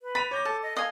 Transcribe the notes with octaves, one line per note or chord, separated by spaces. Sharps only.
B4
B5 A6 D#7 F7
C#5 D6 G6 A#6
A4 A5
D#5
D#5 F5 G#5